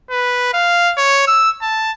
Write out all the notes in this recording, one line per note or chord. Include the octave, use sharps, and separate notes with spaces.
B4
F5
C#5
E6
A5